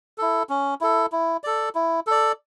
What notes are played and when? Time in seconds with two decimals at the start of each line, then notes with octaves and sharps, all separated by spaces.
0.18 E4 A4
0.49 C#4
0.81 E4 A4
1.12 E4
1.44 A4 D5
1.75 E4
2.07 A4 D5